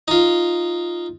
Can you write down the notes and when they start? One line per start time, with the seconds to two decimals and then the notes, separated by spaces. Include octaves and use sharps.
0.08 D#4 F4